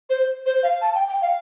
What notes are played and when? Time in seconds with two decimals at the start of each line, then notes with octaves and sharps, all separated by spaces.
0.09 C5
0.46 C5
0.63 F5
0.81 A5
0.94 G5
1.08 G5
1.21 F5